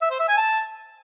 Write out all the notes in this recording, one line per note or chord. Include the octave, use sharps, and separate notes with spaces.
E5
C5
E5
G#5
A5